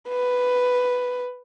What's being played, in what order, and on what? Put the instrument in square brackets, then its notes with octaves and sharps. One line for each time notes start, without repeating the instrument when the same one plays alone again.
[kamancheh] B4